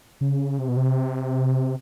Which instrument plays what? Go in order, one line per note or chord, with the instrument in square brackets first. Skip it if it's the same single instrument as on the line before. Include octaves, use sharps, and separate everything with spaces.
[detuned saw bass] C#3
C3
B2
C3